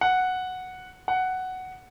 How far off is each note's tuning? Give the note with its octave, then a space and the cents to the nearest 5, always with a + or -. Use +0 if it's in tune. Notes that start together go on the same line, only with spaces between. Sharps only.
F#5 -5
F#5 +5